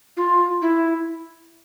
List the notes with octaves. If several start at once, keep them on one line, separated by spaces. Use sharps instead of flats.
F4
E4